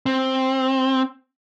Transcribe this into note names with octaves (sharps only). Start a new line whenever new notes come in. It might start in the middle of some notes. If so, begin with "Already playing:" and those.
C4